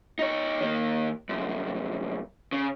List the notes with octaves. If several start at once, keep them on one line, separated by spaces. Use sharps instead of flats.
D#4 C#5
D#3 A#3
C2 F#2
C#3